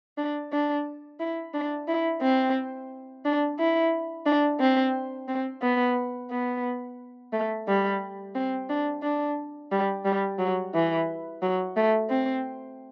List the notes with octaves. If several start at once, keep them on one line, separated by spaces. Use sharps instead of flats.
D4
D4
E4
D4
E4
C4
D4
E4
D4
C4
C4
B3
B3
A3
G3
C4
D4
D4
G3
G3
F#3
E3
F#3
A3
C4